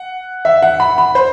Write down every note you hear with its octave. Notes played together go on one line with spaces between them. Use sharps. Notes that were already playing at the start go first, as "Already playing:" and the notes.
Already playing: F#5
E5
F#5
B5
B5
C5